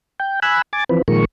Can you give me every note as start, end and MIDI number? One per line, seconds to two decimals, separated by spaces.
0.20 0.40 79
0.42 0.62 80
0.42 0.62 83
0.42 0.62 88
0.42 0.62 90
0.73 0.84 80
0.73 0.84 86
0.73 0.84 93
0.89 1.02 52
0.89 1.02 53
0.89 1.02 60
0.89 1.02 71
1.08 1.25 46
1.08 1.25 51
1.08 1.25 53
1.08 1.25 56
1.08 1.25 70
1.08 1.25 85